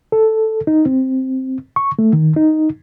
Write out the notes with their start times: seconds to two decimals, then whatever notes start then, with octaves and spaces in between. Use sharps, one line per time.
0.12 A4
0.67 D#4
0.86 C4
1.76 C#6
1.99 A3
2.13 D#3
2.36 D#4